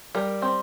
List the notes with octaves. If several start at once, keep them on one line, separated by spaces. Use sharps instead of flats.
G3 A#4
C4